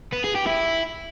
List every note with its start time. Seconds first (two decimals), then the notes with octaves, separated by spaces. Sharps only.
0.12 B3
0.24 G#4
0.35 G4
0.46 E4